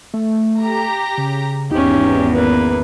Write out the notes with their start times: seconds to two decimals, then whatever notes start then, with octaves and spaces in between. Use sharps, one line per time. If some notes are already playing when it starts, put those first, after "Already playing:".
0.14 A3
0.59 G4 A#5
1.18 C#3
1.71 G#1 E2 C#4 D#4 G4
2.35 A#3 B3 B4